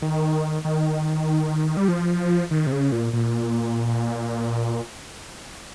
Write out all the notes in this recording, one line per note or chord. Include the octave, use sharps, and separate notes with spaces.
D#3
D#3
G3
F3
D#3
C3
C#3
A#2
A#2